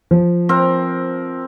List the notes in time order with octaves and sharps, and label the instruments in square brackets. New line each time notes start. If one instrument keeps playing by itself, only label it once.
[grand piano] F3
[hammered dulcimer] C4 A#4